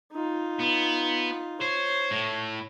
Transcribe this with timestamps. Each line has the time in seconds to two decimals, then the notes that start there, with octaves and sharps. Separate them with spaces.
0.12 D#4 F4
0.59 B3
1.61 C5 C#5
2.11 A2